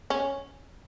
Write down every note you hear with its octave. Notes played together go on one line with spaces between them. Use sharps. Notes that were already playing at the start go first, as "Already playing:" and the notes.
C#4